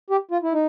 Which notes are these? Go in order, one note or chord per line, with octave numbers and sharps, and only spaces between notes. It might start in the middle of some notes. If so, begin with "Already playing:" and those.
G4
F4
E4
D#4